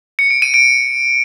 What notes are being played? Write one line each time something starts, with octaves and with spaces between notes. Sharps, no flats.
C#7
D7
D#7
D7